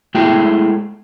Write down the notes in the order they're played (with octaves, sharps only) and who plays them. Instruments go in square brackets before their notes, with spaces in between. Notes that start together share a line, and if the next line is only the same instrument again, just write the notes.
[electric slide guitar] G#3 A3 E4 G#4 G5